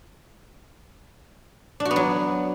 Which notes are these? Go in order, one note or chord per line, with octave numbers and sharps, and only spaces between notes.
D4
F#4
B3
F#3